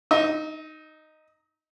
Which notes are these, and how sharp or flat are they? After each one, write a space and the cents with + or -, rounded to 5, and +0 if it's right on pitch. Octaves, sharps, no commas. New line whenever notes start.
D#4 -5 D#5 +45